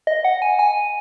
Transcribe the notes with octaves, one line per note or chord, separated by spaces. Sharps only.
D#5
F#5
G#5
G#5